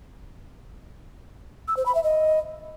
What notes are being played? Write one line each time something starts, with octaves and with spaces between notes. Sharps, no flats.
E6
C5
B5
E5
D#5